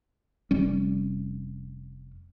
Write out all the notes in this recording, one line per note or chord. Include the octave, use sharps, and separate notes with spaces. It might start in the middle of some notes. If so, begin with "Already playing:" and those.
F1 G3 C#4